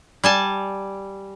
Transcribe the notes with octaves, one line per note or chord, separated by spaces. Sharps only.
G3 G#5 A5